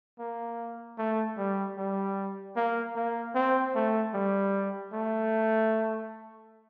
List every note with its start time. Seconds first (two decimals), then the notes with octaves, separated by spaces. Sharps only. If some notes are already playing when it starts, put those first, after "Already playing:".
0.19 A#3
0.98 A3
1.38 G3
1.77 G3
2.56 A#3
2.96 A#3
3.35 C4
3.75 A3
4.14 G3
4.93 A3